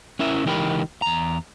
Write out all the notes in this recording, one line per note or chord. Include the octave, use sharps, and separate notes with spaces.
C#4 E4 A#4 E5
C#2 E3 D#4 G4 A#4 B5
E2 A#5